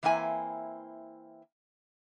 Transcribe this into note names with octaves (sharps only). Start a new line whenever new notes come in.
E3 A#3 C4 E4 G#5